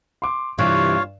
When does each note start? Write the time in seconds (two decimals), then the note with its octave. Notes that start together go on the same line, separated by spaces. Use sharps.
0.22 C6 D6
0.58 G2 C3 E3 F4 C#5 F5